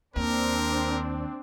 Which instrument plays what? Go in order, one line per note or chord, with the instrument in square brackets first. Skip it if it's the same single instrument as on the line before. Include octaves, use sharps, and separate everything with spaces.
[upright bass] D#2 [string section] C4 D4 [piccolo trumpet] A#4